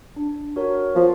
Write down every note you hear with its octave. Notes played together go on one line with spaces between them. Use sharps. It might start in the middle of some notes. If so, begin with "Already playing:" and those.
D4
F#4 A#4 C#5
F3 B3